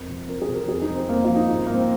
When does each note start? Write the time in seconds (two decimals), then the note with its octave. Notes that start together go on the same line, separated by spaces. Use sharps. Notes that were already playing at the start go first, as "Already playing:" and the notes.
Already playing: F2 A#4
0.08 C3 F3
0.28 F2 A#4
0.42 G#4
0.48 C3 F3
0.55 A#4
0.68 F2 G#4
0.82 D#4
0.89 F3
0.95 C4
1.09 F2 A#3
1.25 F3 F4
1.36 D#4
1.49 G#2
1.67 A#3
1.69 F3 C4